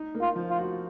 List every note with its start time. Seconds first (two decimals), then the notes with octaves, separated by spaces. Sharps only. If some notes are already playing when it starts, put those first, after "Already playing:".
Already playing: D#4
0.15 A#3
0.21 F4
0.36 F3
0.50 F4
0.57 F#4